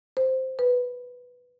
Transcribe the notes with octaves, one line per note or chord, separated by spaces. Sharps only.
C5
B4